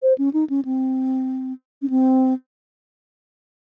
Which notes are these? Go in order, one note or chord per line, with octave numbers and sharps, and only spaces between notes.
C5
C#4
D#4
C#4
C4
C#4
C4